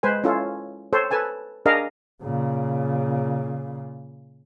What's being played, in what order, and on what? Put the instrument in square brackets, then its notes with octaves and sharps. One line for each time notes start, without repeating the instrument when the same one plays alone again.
[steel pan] G#3 B4 C5 G#5
C#4 E4 F4 A4
A4 C5 C#5
A4 B4 G#5 A5
D4 G#4 A#4 D#5 F5
[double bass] A#2 C#3